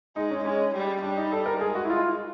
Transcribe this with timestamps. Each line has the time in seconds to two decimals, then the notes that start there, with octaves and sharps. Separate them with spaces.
0.16 G#3 D#4
0.31 C#4
0.45 G#3 C#4
0.75 G3
1.02 G3 D4
1.17 D#4
1.32 A4
1.46 A#4
1.61 G#3 G#4
1.75 F#4
1.85 E4
1.90 F4